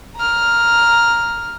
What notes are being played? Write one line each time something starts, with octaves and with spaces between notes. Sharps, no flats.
A#5 F6